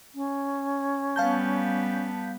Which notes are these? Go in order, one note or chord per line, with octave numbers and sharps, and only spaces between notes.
C#4
G3 B3 F5 A5 G6